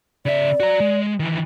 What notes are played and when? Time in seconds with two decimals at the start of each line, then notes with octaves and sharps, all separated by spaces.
0.26 C#3 D5 E5
0.60 F#4 A#5
0.80 G#3
1.20 D#3 E3